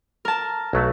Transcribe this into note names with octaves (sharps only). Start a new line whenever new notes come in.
A#4 A5
B1 F#3 A3